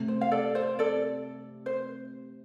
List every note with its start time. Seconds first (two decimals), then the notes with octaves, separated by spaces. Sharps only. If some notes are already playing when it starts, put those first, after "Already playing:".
Already playing: C3 A3 C4
0.08 C5
0.21 F5
0.31 A4 D5
0.55 C5 F5
0.79 A4 D5
1.66 C5